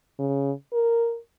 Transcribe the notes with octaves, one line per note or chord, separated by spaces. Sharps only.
C#3
A#4